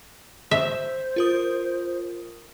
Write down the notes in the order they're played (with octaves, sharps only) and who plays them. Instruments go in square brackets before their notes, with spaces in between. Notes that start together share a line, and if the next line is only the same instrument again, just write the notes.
[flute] C5 [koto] E5
[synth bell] F4 A#4 D#6